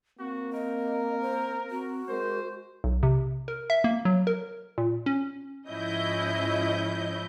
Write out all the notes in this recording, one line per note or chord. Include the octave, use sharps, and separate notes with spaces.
A#3 C4 F#4
A#4 D#5
C5
C4 F#4
G#3 A#4 C5
B1
C3
A#4
E5
A#3
F#3
A#4
A#2
C#4
G#2 F3 C#4 E4 D#5 G6